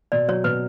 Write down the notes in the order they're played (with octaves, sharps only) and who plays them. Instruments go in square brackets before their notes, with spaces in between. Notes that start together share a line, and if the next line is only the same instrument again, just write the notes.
[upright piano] B2 [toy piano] D5
[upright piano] F#3 [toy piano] C#5
[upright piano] B2 [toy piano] B4